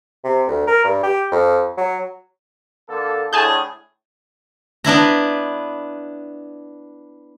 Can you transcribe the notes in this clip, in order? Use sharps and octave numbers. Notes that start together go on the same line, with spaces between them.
C3
D2
A#4
G2
G4
F2
F#3
D3 A#3 A4
A2 D3 G#4 G#5 A5 G6
B3 D4 E4 A#5